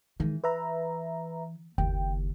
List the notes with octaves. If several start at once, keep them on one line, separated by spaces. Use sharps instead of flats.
D#3 E3 G#3
B4 E5 A#5
F#1 D#2 G5